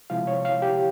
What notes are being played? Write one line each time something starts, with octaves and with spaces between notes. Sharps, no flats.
C3 F3 G#3 E4 F5
C#5
F5
G4